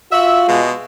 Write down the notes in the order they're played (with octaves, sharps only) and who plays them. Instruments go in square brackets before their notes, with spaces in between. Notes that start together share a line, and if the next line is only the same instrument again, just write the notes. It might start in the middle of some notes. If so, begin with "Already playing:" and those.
[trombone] F4 [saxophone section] F#4 E5
[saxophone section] B2 G#3